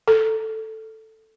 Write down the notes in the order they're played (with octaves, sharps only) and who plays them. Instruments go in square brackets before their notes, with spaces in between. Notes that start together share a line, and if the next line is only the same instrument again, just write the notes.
[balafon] A4